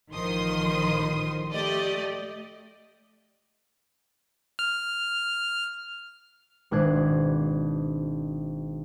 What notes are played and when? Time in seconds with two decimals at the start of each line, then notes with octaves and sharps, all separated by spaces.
0.12 A1 D#3 F3 C6 D#6
1.51 A3 G4 D5 D#5
4.59 F6
6.71 G#1 B2 D4 F#6 G#6 C7